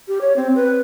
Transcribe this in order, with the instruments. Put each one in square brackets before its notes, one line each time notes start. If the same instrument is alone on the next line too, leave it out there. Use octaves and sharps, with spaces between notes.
[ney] G4
C#5
C4
B4